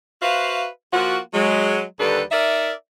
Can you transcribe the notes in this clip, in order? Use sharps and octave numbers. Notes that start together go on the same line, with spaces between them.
F#4 B4 C5 E5 F5
F3 A#3 F4 F#4
F#3 G#3
D#2 D3 G3 D4 A4 B4
D#4 A#4 D5 E5